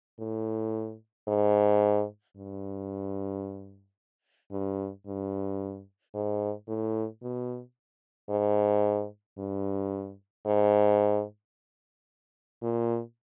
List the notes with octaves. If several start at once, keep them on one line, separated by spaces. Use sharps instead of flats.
A2
G#2
G2
G2
G2
G#2
A2
B2
G#2
G2
G#2
A#2